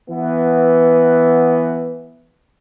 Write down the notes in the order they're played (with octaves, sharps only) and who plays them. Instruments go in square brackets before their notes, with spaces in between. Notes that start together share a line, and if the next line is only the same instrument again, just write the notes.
[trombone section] E3 B3